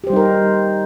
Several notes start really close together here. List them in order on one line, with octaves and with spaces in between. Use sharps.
G4 C5 G3 D#4 A#4